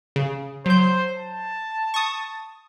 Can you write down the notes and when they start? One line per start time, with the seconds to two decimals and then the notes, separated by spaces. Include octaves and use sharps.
0.16 C#3
0.66 F#3 C5 G6
1.17 A5
1.94 C#6 D#6